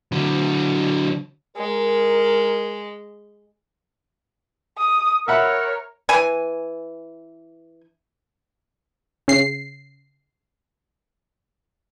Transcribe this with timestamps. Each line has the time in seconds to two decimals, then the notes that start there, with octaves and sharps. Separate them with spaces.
0.12 D3 F#3
1.56 G#3 A#4
4.78 D#6
5.28 A#4 C#5 E5 F#5 B5
6.09 E3 G#5
9.28 C#3 C7